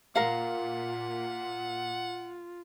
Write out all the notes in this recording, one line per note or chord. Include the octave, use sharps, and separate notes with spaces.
A#2 F4 A#4 F5 F#5